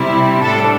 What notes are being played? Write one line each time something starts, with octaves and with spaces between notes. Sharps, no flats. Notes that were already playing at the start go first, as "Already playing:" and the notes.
Already playing: C3 G3 C4 E4
A2 G3 D4 A4